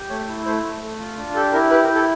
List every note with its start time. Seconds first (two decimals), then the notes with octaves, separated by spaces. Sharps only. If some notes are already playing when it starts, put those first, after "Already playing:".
Already playing: G4
0.10 A3 C#5
0.28 E4
0.46 A3 C5
0.63 A3
0.82 A3
0.99 F4
1.17 D4
1.35 G4 A4
1.53 E4 A#4
1.71 G4 B4
1.83 A#4
1.89 E4
1.95 A4